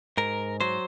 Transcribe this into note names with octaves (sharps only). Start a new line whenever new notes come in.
G#2 A#4
F#3 C5